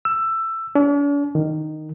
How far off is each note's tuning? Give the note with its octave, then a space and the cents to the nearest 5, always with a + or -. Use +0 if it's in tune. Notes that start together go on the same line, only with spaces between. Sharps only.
E6 +15
D4 -45
D#3 -10